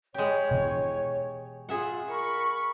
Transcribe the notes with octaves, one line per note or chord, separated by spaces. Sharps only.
G#3 G4 C#5
B2 E3
F4 G#4 E5 F#5
A#4 B5 C#6